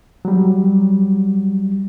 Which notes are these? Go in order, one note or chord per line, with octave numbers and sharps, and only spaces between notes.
F#3 G3